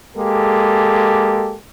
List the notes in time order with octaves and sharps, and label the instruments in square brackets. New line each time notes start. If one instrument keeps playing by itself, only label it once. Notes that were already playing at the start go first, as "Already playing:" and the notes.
[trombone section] G#3 A#3 G4 A4